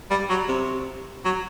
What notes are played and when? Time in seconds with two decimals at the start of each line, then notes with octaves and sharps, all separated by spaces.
0.11 G3
0.30 F#3
0.48 C3
1.25 F#3